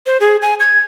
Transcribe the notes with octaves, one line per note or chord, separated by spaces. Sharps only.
C5
G#4
G#5
G#6